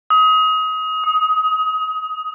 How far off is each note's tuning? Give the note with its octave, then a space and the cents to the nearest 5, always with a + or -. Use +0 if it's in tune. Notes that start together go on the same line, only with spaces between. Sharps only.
D#6 +30
D#6 +10